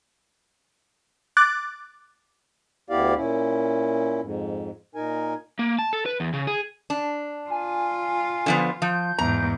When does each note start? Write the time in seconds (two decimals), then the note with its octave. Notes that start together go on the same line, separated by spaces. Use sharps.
1.37 D6 F#6 A6
2.90 D2 B3 E4 G4 D5 F5
3.17 A#2 C#4 E4
4.21 F2 G#2
4.95 A#2 D#4 A#4 G#5
5.59 A#3
5.79 A5
5.93 A4
6.06 B4
6.20 E2
6.33 C#3
6.47 G#4
6.90 D4
7.50 F4 G#5
8.46 D3 F3 B3
8.82 F3 G6
9.18 E2 G#2 A#5